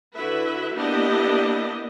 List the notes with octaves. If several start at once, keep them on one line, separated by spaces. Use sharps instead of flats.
D3 E4 F#4 B4 E5
A#3 B3 D4 E4 G4 D#5